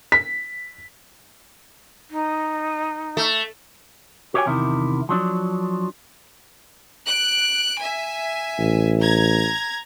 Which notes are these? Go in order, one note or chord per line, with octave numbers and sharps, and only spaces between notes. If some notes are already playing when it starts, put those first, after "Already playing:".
B6
D#4
A3
F#4 G4 C#5 D5 G5 G#5
E2 C3 D#3 E4
F3 F#3 D4
F#6 D7
E5 G#5
A1
A#5 G#6